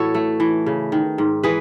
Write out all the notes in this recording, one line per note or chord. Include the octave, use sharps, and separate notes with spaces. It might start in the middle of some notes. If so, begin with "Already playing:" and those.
Already playing: A2 E3 E4 F#4 A4 C#5
A3
E3
C#3
D#3
G#2
E3 G#4 B4